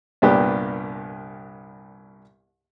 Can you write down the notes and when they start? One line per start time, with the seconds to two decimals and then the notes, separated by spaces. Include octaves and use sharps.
0.22 C2 G2 A#2 B3 G4